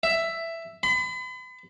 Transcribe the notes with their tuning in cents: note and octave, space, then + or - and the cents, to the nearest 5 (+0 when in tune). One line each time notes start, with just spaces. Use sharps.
E5 +10
B5 +40